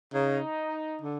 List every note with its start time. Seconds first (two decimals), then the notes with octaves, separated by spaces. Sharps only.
0.14 C#3 D#4
1.02 D3